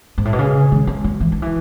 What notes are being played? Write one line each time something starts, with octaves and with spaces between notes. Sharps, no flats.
G#2
A2
B2
C#3
D#3
G#3
F#3
E3
D#3
E3